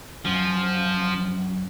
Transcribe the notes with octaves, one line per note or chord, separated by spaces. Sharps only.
F#2 F3